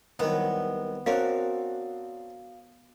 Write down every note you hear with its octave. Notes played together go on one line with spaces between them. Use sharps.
C2 D#3 F#3 B3
C4 D4 F#4 A#4 C#5 F5